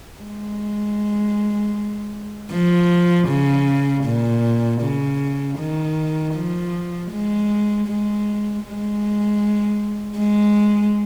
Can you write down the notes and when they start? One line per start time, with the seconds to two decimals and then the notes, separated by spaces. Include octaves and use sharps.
0.22 G#3
2.51 F3
3.28 C#3
4.04 A#2
4.82 C#3
5.58 D#3
6.34 F3
7.11 G#3
7.87 G#3
8.64 G#3
10.17 G#3